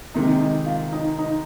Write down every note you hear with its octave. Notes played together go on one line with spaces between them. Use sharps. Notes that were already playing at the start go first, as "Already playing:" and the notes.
C3 D#3 G#3 D#4
D#4
F4
D#4
D#4